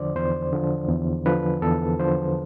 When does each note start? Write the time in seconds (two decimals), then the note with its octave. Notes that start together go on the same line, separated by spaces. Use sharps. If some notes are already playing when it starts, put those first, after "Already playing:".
Already playing: E2 D3 F3 C5 D5
0.16 E2 C5
0.53 D3 F3
0.89 E2
1.26 D3 F3 B4
1.62 E2 A4
2.00 D3 F3 C5